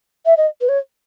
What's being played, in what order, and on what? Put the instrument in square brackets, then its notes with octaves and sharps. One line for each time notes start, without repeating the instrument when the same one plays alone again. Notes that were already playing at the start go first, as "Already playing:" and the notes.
[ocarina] E5
D#5
B4
C#5